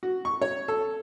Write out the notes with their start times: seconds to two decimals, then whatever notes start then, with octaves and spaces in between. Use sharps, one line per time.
0.03 F#4
0.25 C#6
0.42 C#5
0.68 A4